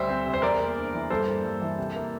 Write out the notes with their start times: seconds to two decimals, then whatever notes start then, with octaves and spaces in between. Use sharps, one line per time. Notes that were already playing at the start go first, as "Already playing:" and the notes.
Already playing: D2 G3 C5 E5
0.09 C4
0.26 C3
0.34 C5
0.42 E2 A#4 D5
0.59 A#3
0.76 D4
0.94 E3
1.10 G2 A4 C5
1.28 A#3
1.44 G2
1.62 E3
1.78 C3
1.96 A#3